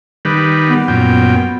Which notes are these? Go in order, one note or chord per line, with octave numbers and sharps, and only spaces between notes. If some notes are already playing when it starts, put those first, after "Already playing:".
D#3 G3 B4
B3
F#2 A#2 G5